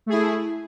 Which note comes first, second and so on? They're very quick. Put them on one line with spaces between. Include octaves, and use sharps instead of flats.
A3 G#4 E4